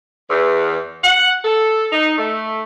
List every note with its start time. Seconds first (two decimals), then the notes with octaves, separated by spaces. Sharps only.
0.30 E2
1.04 F#5
1.45 A4
1.92 D#4
2.18 A3